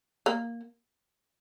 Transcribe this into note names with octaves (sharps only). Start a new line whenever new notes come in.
A#3